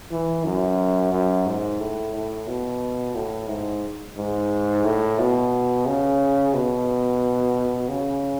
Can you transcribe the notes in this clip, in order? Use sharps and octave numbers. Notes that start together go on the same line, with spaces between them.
E3
F#2
F#2
G#2
A2
A2
B2
A2
G#2
G#2
A2
B2
C#3
B2
C#3